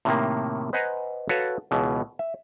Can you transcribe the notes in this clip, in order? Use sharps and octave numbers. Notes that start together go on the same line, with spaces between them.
A2 C3 D#3 A#3
B4 C5 D#5 F#5 G#5 A#5
F#4 A4 B4 C#5 F5
C#2 B2 E3
E5